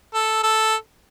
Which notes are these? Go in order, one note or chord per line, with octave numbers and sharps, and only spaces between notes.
A4
A4